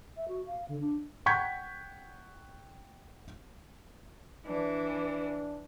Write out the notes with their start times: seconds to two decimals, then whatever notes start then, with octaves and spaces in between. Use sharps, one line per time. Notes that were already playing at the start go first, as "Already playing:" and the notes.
0.17 E5
0.28 F#4
0.46 F5
0.68 D3
0.80 D4
1.26 F#5 G5 C#6 G6 G#6 B6
4.48 E3 D4